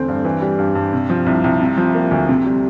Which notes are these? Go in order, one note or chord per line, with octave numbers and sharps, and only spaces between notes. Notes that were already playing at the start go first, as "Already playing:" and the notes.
Already playing: E2 D3 A3 C4
G2
E3
G3
G2
G2
C3
F3
C2
C2
C3
F3
A#3
D2
C3
G3